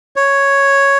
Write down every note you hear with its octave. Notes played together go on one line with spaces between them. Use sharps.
C#5